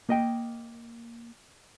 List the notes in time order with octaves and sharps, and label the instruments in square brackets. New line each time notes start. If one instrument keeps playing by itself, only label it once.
[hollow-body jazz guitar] A#3 D#5 G5